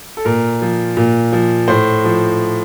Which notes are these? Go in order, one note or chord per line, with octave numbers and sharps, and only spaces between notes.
A4
A#2 A#4
F3
A#2
F3
A2 C5
F3